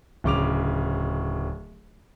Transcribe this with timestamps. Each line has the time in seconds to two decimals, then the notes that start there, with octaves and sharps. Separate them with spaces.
0.24 D1 C#3 D6 F7